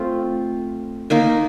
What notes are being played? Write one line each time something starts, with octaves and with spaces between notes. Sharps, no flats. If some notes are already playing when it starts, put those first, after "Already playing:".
Already playing: A3 C4 F4
D#3 A#3 D#4